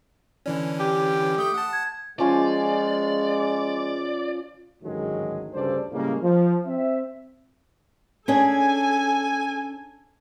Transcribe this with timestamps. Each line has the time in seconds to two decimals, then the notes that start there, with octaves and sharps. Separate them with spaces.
0.46 D3 E3 C#4 D5
0.80 G4
1.38 A3 D#6 G6
1.54 F#5 A5
1.73 G#6
2.19 F3 G#3 C#4 F4 D5
4.83 A1 D2 G#2 D#3 F#3 G#3
5.53 D2 G2 C#3 A4 C5 D5
5.92 A2 C#3 G3 G#3 A#3
6.21 F3
6.66 C4 E5
8.28 C#4 D4 G#4 A4 G#5